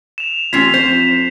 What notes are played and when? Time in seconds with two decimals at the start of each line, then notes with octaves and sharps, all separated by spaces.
0.18 E7 F7
0.53 A1 C4 C#4 F4 B6 C7 F7
0.74 F2 C5